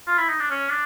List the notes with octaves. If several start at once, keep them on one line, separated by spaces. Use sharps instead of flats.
F4
E4
D#4
D4
C#4
D4